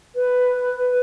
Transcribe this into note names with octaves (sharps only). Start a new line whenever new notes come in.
B4